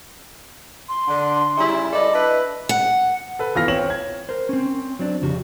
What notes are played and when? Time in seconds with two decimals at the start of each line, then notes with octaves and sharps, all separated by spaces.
0.89 C6
1.08 D3 D4
1.57 C#3 G3 E4
1.93 A4 B4 D5 D#5
2.13 D4 E4 B4
2.69 F#5
3.39 A4 B4
3.55 E3 B3 F4 A4 F6 A#6
3.68 C4 C#5 E7 F#7
3.90 G#6
4.29 A#4 C5
4.49 C4 C#4
4.99 F#3 C4 D4
5.22 F2 C#3 F#4 G4